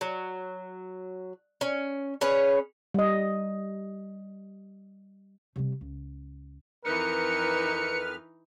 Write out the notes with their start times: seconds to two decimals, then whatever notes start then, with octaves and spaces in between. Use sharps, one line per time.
0.01 F#3
1.61 C#4
2.21 C#4 G#4 B4 C#5
2.94 G3 D#5
5.56 C3 G3
5.81 C#2
6.85 F2 E3 D#4 A#4 B4 F6 C#7